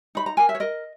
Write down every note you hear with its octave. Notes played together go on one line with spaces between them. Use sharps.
D#4 B5
A#5
A#4 G#5
E5
C#5
A#4 D#5